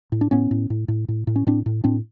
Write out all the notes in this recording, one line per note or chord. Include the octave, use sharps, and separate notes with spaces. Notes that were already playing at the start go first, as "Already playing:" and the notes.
A2
D4
A2 B3 C#4
A2
A2
A2
A2
A2
C#4
A2 C4 D4
A2
A2 C4 D4